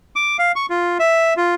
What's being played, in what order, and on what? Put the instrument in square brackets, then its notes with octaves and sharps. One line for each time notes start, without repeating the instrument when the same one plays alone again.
[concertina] D6
F5
C#6
F4
E5
F4